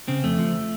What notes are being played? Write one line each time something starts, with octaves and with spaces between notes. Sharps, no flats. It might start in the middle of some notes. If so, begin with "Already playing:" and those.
C#3 C4
F2 A3
F3